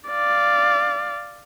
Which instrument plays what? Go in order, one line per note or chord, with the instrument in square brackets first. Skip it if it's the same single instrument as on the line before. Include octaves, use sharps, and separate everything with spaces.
[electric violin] D5 F5